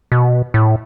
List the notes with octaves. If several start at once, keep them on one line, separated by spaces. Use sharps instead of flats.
B2
A2